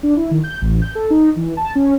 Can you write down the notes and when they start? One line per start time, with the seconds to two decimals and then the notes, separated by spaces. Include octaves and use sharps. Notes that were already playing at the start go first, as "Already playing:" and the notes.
0.03 D4
0.17 E4
0.31 D#3
0.44 G6
0.61 A1
0.82 G6
0.95 A4
1.10 D#4
1.36 E3
1.57 A5
1.75 C#4